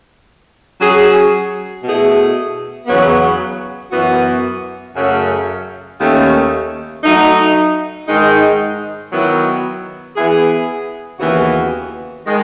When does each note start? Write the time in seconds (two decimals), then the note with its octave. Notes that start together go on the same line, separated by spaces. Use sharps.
0.80 F#3 C#4 G#4
1.84 B2 A3 E4 G#4
2.87 E2 C#3 F#3 B3
3.92 F#2 E3 B3 F#4
4.96 F#2 C#3 F#3 A3 C#4
6.00 D#2 D#3 A3 C#4
7.04 F#3 A3 D#4
8.08 G#2 D#3 G#3 D#4
9.12 D#3 F#3 B3 E4
10.16 E3 B3 E4 G#4
11.19 D#2 C#3 E3 B3 F#4
12.26 D#3 G#3